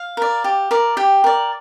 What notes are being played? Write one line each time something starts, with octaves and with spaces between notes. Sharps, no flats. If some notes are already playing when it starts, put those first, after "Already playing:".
Already playing: F5
A#4 D5
G4
A#4 D5
G4 G5
A#4 D5